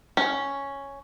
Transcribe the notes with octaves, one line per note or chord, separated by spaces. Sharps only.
C#4